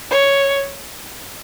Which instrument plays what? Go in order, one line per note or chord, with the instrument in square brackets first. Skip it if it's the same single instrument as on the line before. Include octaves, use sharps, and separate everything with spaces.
[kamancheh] C#5